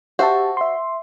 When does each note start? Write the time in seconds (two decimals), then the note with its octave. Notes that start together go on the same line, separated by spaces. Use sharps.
0.19 F#4 G4 C5 E5 A5
0.57 E5 C6